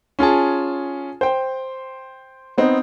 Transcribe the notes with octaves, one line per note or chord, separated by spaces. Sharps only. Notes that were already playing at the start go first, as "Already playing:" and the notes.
C#4 F4 G#4 A5
C5 G5
B3 C4 D#4